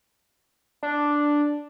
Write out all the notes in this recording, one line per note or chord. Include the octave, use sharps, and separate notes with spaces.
D4